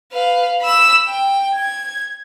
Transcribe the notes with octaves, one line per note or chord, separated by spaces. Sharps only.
B4 F5
B5 E6
G5
G#6